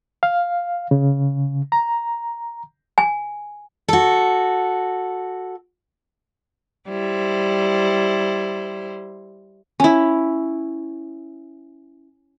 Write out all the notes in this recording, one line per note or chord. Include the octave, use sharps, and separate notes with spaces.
F5
C#3
A#5
G#5
F#4 A4
G3 E4 C5
C#4 E4